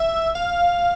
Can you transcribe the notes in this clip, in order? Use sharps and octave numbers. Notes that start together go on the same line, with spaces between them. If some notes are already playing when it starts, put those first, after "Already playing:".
Already playing: E5
F5